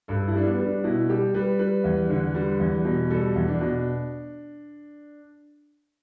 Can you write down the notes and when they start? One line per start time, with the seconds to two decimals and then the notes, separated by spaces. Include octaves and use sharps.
0.08 G2 A4
0.28 E4
0.34 G3 D4
0.46 B3
0.58 G3
0.64 D4
0.84 B2 E4
1.09 G3 G4
1.34 G3 B4
1.59 G3 B4
1.84 E2
2.10 D3
2.34 G3
2.60 E2
2.85 B2
3.10 G3 A4
3.36 E2
3.48 D4
3.61 B2